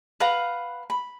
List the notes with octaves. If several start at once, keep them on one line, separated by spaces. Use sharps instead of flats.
B4 F5 F#5 A#5
B5